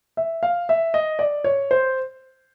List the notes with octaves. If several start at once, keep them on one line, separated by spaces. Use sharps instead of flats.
E5
F5
E5
D#5
D5
C#5
C5